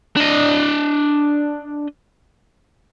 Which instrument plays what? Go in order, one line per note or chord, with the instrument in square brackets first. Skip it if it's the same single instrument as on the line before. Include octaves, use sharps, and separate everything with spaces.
[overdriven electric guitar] D4 D#5